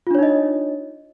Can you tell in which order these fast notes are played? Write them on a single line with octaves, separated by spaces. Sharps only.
F4 D4 C#5 D#4 D#5